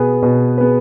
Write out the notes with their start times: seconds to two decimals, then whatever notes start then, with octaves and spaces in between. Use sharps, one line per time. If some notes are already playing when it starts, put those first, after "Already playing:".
Already playing: B2 B3 G#4 B4
0.22 B2
0.58 B3 G#4 B4